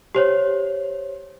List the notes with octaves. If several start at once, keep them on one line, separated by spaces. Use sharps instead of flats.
G4 C5 C#5